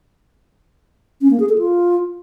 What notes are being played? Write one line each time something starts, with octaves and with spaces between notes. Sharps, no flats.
C#4
A#3
G#4
A4
F4